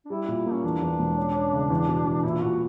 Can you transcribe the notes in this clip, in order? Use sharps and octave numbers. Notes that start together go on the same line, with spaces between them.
D4
G3 E4
A#2
A#3
C#4
E2 D4
E2
E1
C#4
C#4
C#3
E2
B2
E2
A#2 E4
A#2 F#4